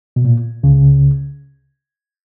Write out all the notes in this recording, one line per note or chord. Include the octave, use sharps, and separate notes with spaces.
B2
A#2
C#2 C#3